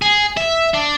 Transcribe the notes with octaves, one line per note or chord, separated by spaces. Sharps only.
G#4
E5
D4